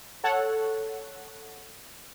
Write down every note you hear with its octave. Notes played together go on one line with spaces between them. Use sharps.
A4 C#5 F#5